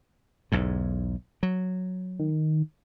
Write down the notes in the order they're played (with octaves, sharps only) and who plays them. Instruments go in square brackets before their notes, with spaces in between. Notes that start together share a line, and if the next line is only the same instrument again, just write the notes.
[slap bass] B1 E2 G#2
F#3
[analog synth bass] D#3